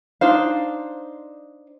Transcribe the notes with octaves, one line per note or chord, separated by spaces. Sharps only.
D4 D#4 C5 F5